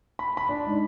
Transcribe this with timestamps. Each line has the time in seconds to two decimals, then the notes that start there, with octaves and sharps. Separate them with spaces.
0.19 B5
0.37 B5
0.49 D4
0.66 G#2